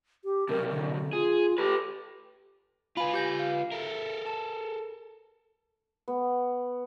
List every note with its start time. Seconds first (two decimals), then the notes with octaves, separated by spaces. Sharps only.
0.25 G4
0.49 B1 C3 A#4
0.70 D3
1.13 F4 G#4
1.58 G4 A4 B4
2.97 F4 B4 G#5 B5
3.14 G4 G6 A#6
3.39 F5
3.72 A4 A#4 E5
4.26 A5
6.08 B3